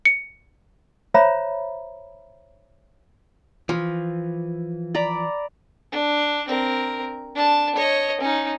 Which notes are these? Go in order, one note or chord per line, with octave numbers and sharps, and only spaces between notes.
C#7
C5 C#5 E5 A#5 B5
E3 F3
D5 A#5 B5
D4
C4 A#4
D4 A5
C#5 D#5
C#4 D#4